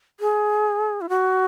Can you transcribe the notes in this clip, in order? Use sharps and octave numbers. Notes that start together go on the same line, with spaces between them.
G#4
E4
F#4